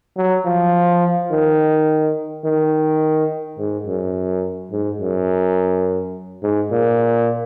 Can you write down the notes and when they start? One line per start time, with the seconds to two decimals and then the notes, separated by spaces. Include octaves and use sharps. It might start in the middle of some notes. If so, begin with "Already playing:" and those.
0.17 F#3
0.45 F3
1.31 D#3
2.45 D#3
3.58 G#2
3.87 F#2
4.72 G#2
5.01 F#2
6.43 G#2
6.71 A#2